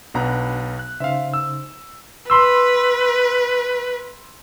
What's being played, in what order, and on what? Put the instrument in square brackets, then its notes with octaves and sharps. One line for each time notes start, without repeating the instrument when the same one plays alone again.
[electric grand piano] B1 B2 A#5 [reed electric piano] D4 B5 F#6
[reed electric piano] F#6
[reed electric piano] C#3 D#4 C5 [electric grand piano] E5 F5
[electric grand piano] E6
[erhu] B4 [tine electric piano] B5 C6 E6